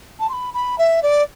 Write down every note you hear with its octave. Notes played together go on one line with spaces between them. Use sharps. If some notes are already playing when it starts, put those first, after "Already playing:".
A5
C6
B5
B5
E5
D5